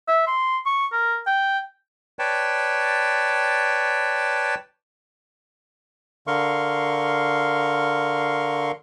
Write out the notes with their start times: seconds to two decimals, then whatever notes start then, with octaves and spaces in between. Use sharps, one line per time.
0.08 E5
0.27 C6
0.66 C#6
0.93 A#4
1.27 G5
2.19 B4 C#5 D5 G5 A5
6.27 D3 A#4 F5 C6 C#6